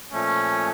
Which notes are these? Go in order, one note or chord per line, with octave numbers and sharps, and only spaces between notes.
A#2 F3 A3 C#4